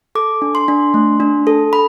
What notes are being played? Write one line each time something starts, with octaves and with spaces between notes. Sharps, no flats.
A4 D6
D4
C6
D4
A3
D4
A4
B5